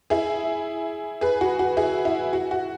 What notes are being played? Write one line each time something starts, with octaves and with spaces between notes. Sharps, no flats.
E4 G#4
G#4 B4
F#4
F#4
E4 G#4
E4
F#4
F#4